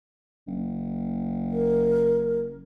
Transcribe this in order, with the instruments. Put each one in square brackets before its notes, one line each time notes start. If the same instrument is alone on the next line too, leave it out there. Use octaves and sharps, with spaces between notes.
[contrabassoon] F#1
[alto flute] A#4